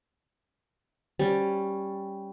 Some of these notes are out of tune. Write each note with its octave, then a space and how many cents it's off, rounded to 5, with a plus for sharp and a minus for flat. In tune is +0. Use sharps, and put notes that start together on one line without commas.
G3 +0 C#4 +0